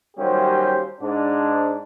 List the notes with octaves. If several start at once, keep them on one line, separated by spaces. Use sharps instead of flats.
D#2 F#3 G3 C#4 G4 C5
G#2 D4